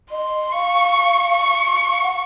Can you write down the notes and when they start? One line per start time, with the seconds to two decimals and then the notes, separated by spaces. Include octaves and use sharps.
0.11 D#5 C6
0.52 F5 C#6
1.33 C#6
1.90 F5
2.02 F#5